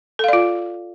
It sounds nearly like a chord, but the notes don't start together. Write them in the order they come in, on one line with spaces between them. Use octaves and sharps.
A4 F5 D5 F4